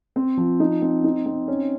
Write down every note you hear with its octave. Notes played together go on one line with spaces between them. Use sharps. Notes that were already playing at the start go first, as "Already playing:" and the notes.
C4
F3
D#4
C4
D#4
C4
C#4